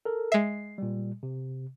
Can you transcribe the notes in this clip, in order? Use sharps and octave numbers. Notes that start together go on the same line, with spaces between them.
A4 A#4
G#3 E5 C7
A#2 G3
C3